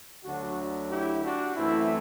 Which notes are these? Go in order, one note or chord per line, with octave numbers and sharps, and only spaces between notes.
D2 D3 F#3 D4 F#4
E4 G4
D4 F#4
F#2 E3 A3 C4 E4